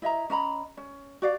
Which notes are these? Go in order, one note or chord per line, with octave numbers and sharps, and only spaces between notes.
E4 D#5 E5 A#5
C#4 D#5 A#5 B5
C#4
F#4 D5 F5